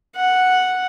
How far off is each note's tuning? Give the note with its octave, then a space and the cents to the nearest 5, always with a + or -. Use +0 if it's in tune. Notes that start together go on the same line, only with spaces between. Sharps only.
F#5 -5